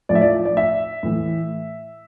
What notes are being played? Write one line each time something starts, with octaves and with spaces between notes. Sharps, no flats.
A2 F3 D5
E5
D5
D5
E5
A2 E3